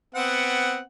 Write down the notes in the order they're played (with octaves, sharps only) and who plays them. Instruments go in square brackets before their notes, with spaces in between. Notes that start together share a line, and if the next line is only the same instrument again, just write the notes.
[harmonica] B3 C4 F#5